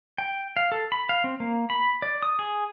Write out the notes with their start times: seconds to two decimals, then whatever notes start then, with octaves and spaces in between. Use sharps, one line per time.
0.18 G5
0.57 F5
0.72 A4
0.92 B5
1.09 F5
1.24 C4
1.40 A#3
1.70 B5
2.02 D5
2.22 D#6
2.39 G#4